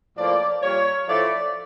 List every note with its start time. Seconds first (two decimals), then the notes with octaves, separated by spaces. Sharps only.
0.16 A2 F3 A#3 D5
0.62 A#2 G3 A#3 C#5
1.07 A2 F3 A3 D5